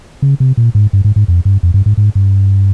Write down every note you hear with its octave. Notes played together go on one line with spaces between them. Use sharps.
C#3
C3
A#2
G#2
G2
G#2
G#2
F2
G2
F2
G2
G#2
G#2
G2